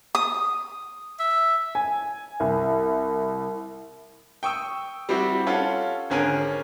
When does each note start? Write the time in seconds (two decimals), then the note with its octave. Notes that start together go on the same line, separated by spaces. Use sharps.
0.15 D#6
1.20 E5
1.75 G#5
2.40 C2
4.43 G5 C#6 D#6 E6
5.09 G3 C4 E4 F#4 G4
5.47 C#4 F4 A4 F#5
6.10 G#1 D3 C#4 G#4 A#4 D#7